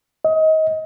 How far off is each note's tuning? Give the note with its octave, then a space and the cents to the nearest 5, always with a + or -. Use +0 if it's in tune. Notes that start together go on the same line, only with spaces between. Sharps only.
D#5 +25